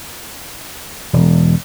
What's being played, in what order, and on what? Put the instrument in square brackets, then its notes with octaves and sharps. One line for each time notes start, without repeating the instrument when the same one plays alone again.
[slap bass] E1